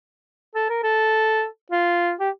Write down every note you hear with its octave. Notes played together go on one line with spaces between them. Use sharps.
A4
A#4
A4
F4
G4